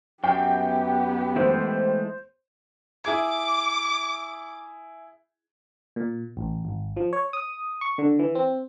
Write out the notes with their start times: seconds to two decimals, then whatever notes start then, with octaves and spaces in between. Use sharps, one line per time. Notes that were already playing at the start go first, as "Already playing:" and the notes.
0.24 F#2 B3 G4 G5
1.36 E3 G#3 A3 C5
3.05 E4 G#4 D6 G#6
5.96 A#2
6.37 A1
6.65 G#1
6.96 F3
7.13 C#5
7.33 D#6
7.81 C#6
7.98 D3
8.19 E3
8.35 C4